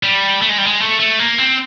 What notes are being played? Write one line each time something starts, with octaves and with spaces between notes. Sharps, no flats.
G3
A3
G#3
G3
G#3
A3
A3
A#3
C4